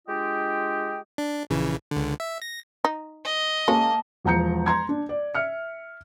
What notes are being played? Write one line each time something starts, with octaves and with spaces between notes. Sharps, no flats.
G#3 D4 F4 G4 D#5 G5
D4
A#1 C#3 E3
C#2 D3
E5
A#6
D#4
D#5
G#3 A#3 C#4 A5
E1 E2 F3 A#5 G6 C#7
A#5 C6 G#6
D4
D5
E5 F6 C#7